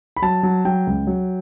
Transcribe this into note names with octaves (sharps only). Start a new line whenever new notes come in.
B5
F#3 A5
F#3
F#3 G5
C#2
F#3